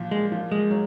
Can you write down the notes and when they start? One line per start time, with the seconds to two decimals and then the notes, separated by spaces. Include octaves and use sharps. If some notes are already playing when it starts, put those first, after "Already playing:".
Already playing: A#2 F3
0.11 G#3
0.32 F3
0.52 G#3
0.71 F#3